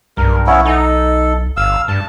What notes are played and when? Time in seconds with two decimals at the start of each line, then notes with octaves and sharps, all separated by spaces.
0.17 B1 G2 A#4
0.47 B3 C#4 E4
0.65 D#4 A4
1.57 G1 F5 E6
1.88 G2 A5